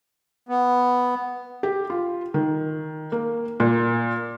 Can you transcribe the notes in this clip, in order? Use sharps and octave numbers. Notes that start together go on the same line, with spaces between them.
B3
G4
F4
D#3
A#3
A#2